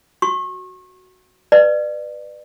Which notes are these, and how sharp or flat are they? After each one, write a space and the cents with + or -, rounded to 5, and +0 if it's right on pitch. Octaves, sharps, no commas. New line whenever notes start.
F#4 +0 C#6 -35
B4 +0 D5 +30